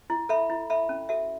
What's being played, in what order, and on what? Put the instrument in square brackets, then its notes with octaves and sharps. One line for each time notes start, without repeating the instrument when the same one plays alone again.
[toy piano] E4
A4 E5 B5
E4
A4 E5 B5
C#4
F#4 A4 E5